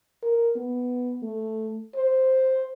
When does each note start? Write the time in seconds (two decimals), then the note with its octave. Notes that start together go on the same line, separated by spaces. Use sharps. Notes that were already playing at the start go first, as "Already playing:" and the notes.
0.23 A#4
0.56 B3
1.23 A3
1.96 C5